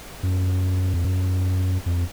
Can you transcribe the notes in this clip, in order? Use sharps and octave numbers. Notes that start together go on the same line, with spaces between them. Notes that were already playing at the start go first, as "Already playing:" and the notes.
F#2
F2
F#2
F2